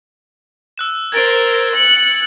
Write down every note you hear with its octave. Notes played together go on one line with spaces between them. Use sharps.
E6 F#6 E7
A#4 C5 G#6 A6 D7
F#6 C#7